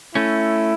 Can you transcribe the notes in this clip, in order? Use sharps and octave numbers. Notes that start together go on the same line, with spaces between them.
A3 C#4 E4